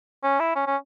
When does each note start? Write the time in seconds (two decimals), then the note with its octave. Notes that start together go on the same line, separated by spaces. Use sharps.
0.23 C#4
0.39 E4
0.55 C#4
0.67 C#4